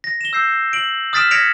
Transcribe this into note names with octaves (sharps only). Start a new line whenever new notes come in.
A#6
E7 G7
E6 G6 C7
D7 F#7
D#6 F6 A6 B6 D7 E7
G#6 A#6 B6 C#7 D7 F7